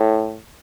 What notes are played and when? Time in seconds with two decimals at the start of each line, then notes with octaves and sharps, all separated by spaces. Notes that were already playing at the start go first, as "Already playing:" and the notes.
Already playing: A2